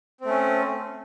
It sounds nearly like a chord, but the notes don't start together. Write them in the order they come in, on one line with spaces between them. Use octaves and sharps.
C4 A3 C#4